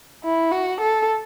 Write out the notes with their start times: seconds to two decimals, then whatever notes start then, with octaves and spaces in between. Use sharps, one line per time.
0.24 E4
0.52 F#4
0.81 A4